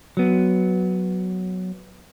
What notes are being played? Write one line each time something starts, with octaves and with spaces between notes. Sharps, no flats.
F#3 B3